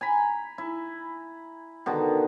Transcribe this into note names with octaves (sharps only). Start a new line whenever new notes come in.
G#5 A#5 B5
E4
B2 D3 D#3